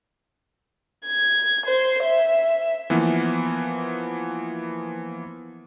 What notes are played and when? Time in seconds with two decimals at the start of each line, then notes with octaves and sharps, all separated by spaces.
1.06 G#6
1.66 C5
2.03 E5
2.90 E3 F3 A#3 B3